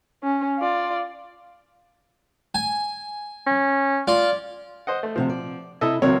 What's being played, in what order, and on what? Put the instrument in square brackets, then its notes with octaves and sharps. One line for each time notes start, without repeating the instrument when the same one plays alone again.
[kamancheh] C#4
F4 D5
[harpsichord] G#5
[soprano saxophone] C#4
[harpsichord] F4 [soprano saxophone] D5
[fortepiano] C5 D#5 F#5
A3
[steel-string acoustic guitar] D2 C3 F#5 [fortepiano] F3
[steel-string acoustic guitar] D5
[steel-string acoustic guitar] C3 E4 [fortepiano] A4 D#5 E5
[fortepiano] C#2 A#4 C#5 [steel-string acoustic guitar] E3 F#3 C4